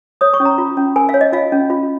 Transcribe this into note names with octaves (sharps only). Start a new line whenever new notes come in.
C#5 D#6
C#6
C#4
A#5
F4
C#4
A#4 G#5
F5
C#5
D#5
F4 F5
C#4
F4